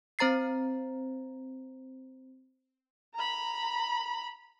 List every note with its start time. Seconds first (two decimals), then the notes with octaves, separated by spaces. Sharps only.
0.19 C4 C5 A#5 A6 C7
3.15 A#5 B5